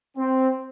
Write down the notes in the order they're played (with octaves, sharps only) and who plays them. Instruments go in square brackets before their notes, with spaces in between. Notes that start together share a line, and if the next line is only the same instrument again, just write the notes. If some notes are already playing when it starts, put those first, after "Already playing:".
[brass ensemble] C4